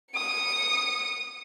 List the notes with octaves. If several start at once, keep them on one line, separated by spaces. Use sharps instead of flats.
D#6 C#7